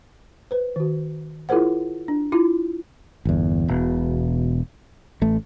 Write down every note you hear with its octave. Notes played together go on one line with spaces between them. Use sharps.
B4 C5
D#3 F#4
E4 F4 G#4 A#4 C5 F#5
D4
E4 F4 A#5
G1 E2
E1 B2
A1 A3